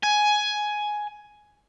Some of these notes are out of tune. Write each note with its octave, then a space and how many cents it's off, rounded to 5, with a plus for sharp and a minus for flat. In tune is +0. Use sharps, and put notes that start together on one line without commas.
G#5 +10